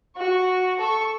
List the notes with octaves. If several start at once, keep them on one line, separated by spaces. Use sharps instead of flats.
F#4 C#6
A4 C#6